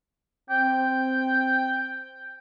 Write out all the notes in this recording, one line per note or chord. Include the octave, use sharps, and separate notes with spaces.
C4 G5